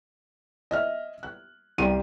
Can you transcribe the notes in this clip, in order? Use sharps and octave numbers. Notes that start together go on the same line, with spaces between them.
D#5 E5 F6
F#6
C2 G4 G5 C6 D#7